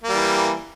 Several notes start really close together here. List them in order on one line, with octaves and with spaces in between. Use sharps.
A#3 G3 E3